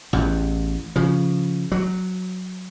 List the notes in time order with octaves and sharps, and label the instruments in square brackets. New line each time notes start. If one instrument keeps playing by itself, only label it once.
[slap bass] A1 E2
C#3 F3
F#3